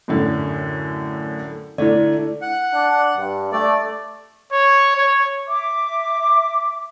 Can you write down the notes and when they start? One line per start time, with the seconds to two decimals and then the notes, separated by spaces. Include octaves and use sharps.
0.08 F#2 A2 D3
1.78 D3 A3 E4 D5
2.42 F#5
2.74 D4
3.18 G2
3.52 A3 D5
4.52 C#5
4.96 C#5
5.48 E5 D6